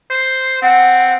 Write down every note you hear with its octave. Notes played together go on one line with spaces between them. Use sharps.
C5
C4 F#5